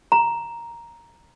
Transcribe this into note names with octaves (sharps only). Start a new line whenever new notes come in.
A#5